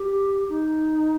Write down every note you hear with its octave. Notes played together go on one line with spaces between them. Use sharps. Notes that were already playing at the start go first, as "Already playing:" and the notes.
Already playing: G4
D#4